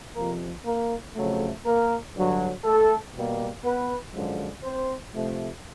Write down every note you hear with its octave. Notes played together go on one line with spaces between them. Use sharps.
F2 C3 F3 A#3 A#4
A#3 A#4
F2 C#3 F#3 A3
A#3 A#4
G2 D3 F#3
A3 A4
B2 G3 A#3
B3 B4
F#2 D3 F3 G#3
C4 C5
C3 F3 A3